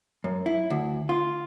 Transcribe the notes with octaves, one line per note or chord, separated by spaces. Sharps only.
F#2
E4
D2
F4